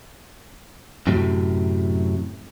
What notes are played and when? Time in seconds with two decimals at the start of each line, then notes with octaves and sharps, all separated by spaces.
1.07 F#2 A2 C3 F#3